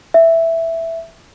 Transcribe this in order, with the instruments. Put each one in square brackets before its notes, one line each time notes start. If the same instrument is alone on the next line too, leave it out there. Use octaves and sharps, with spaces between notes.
[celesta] E5